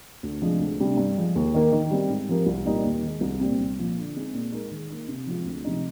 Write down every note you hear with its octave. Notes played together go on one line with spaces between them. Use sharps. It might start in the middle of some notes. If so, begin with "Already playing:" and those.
D2
C3 F3 G#3 D4
D2
C3 G3 D4
G2
F3 G#3
D#2
D#3 A#3
D#3
G3 C4 G4
G#2
F3 C4 G4 A#4
C2
A#2 G3 A#3 D#4
D#2
D#3 G#3
C2
A#2 G3 C4
C2
A#2 F3
D3
G#3 C4 D#4 G#4
A#2
G#3 D#4 A#4
D#3
A#3 D#4
C3
F3 G#3 C4 F4
D2
C3 F3 G#3 D#4